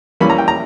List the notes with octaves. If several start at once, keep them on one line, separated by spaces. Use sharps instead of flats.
E3 G3 A#3 C#4 B5
A#5
G5
A#5